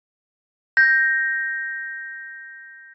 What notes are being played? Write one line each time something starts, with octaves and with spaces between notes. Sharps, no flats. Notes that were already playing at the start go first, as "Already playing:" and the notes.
G6 A#6